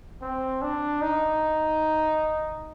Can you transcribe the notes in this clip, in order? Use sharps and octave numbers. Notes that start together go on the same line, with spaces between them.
C4
D4
D#4